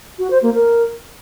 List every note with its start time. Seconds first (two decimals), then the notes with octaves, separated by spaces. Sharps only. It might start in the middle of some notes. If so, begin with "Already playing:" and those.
0.19 F#4
0.31 C5
0.42 A#3
0.54 A#4